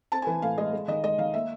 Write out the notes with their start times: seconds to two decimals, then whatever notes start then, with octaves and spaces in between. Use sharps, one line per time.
0.12 C4 A5
0.22 G#5
0.27 E3
0.42 A2 F5
0.58 G#3 D#5
0.73 G#3
0.88 D#3 D#5
1.04 G#3 D#5
1.18 D#3 F5
1.34 A#3 E5